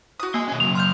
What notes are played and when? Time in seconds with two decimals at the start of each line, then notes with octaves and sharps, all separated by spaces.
0.20 F#4 D#6
0.34 A#3 D#5 G#5
0.48 B2 C#4
0.60 C#3 F#3 F7
0.75 C6 F6 G6